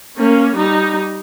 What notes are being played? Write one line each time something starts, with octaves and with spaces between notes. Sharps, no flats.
A#3 C#4
G3 D#4